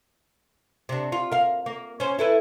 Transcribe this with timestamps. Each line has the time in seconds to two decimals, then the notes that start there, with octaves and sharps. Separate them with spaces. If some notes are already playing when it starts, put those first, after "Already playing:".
0.89 C3 D4
1.12 F4
1.31 A#4 F5
1.66 A#3
2.00 C#4 C5
2.19 E4 A4 B4